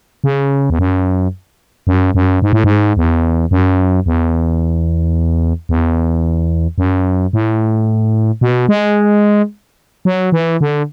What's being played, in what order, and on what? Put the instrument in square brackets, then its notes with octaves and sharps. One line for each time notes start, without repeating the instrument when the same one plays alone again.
[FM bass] C#3
E2
F#2
F#2
F#2
G#2
A2
G#2
E2
F#2
E2
E2
F#2
A2
B2
G#3
F#3
E3
D3